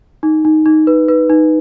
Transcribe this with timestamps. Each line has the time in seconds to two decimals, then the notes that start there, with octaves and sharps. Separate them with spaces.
0.23 D#4
0.45 D#4
0.66 D#4
0.87 B4
1.09 B4
1.30 D#4